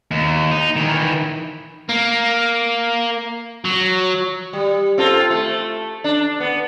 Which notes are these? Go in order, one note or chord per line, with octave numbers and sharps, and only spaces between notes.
D#2
D#4
D#3 E3
A#3
F#3
G3
C4 F4 A4
A3
D4
B3